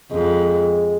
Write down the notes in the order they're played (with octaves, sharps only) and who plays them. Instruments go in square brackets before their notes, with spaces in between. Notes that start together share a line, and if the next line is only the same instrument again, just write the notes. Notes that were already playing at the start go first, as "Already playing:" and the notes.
[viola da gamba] F2 [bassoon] G#3